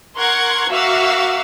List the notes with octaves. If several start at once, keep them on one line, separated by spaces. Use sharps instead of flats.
A#4 F#5 C6 C#6 G#6
A#3 F#4 E5 F5 D6 E6